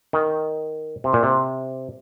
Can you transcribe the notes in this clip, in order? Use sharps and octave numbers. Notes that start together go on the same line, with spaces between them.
D#3
C3
A#2
C3